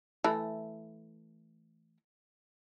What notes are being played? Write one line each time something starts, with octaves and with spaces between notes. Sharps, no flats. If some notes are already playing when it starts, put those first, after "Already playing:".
E3 A3